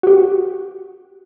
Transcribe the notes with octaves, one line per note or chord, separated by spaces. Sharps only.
F#4 G4